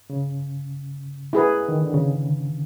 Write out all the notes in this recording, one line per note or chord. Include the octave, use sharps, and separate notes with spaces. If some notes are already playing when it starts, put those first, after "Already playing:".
C#3
E4 G#4 B4
D#3
D3
C#3